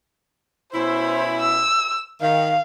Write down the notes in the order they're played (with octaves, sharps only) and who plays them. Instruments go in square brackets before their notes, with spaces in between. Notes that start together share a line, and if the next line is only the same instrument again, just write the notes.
[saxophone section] B2 C#4 E4 [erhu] C5
[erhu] E6
[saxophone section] D#3 [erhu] F5